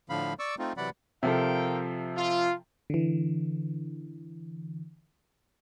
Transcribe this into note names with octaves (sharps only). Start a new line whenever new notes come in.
A2 D3 F3 F5 B5
D5 C#6 D6 E6
A3 C4 D#4 F4
C3 E3 F#3 D5 F#5 B5
C3 F3 A4 A#4 F5 G5
F4
D3 E3